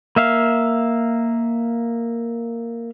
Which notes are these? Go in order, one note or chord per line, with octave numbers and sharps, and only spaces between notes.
A#3 E5 F5